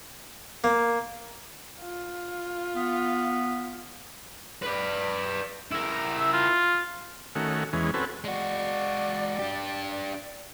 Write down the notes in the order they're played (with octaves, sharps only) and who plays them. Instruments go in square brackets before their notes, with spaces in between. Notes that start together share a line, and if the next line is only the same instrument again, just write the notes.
[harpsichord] A#3
[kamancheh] F4
[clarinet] B3
[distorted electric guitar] B4 D5
E4 A#4
[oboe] E5
F4
[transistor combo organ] D#3 A3 C#4 F#4
E2 E3 G#3 C#4
C4 C#4 F#4 A4 B4
[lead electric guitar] G#3 F#4 [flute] D5
[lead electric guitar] D4 G4